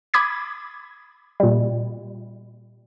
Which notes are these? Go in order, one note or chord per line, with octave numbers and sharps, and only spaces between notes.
B5 D6 D#6 G#6 B6
A#2 G3